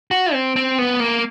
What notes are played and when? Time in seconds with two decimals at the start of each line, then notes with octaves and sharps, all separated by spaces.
0.11 F#4
0.33 C4
0.56 C4
0.79 B3
1.00 A#3